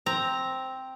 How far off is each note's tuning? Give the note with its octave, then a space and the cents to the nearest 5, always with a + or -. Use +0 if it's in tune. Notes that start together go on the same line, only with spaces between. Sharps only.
C4 +0 A#5 +0